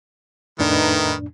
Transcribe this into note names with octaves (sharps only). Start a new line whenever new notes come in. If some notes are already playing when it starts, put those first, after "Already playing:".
F2 A2 D#3 A3 D4 D#4 B4